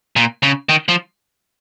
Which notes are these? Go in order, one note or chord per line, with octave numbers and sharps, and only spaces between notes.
A#2
C#3
D#3
F3